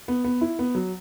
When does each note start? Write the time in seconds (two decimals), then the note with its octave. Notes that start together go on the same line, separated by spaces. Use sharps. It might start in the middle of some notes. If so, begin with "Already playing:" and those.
0.08 B3
0.24 B3
0.41 E4
0.59 B3
0.75 F#3